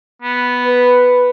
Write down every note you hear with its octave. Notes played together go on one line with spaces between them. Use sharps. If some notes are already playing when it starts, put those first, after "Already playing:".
B3
B4